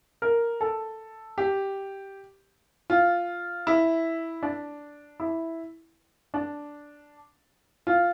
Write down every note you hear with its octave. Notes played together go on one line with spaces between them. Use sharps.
A#4
A4
G4
F4
E4
D4
E4
D4
F4